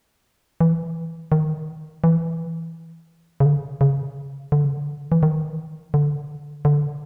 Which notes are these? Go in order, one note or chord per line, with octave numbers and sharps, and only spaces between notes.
E3
D#3
E3
C#3
D3
C#3
D3
C#3
D3
E3
D#3
D3
D3